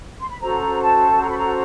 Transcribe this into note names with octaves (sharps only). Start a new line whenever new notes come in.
C6
B5
C#4 F#4 A4 C5 A#5
A5
A#5
B5
A#5